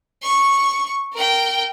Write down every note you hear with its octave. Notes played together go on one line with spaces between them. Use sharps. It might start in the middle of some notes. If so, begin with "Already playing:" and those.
C#6
A#4 G5